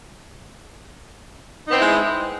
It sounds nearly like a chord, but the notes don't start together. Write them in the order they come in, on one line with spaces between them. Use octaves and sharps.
D#4 B3 C4 E4 G#3